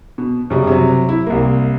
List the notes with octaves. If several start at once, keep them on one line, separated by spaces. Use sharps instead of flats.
B2
F#2 C#3 G3
C3 F#3
E4
C2 A#3